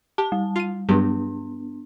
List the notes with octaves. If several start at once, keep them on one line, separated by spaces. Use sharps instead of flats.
G4 A5
G3
F4 D#7
G2 F#3 G3 B3 D4